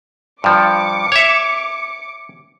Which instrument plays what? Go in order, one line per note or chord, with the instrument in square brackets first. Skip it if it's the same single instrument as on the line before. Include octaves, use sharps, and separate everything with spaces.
[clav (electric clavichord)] G2 F3 [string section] D6 C#7
[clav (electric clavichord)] C#5 E5